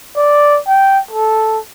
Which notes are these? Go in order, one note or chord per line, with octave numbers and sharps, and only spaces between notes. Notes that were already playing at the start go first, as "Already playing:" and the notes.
D5
G5
A4